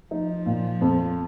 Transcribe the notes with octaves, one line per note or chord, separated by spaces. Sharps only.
F3 D#4
A#2
F2